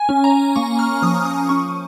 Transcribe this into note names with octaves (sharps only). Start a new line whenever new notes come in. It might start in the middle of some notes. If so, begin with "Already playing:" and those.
Already playing: G#5
C#4
A#5
A#3 C#6
F6
F3 D#6
D#6
C#4 C#6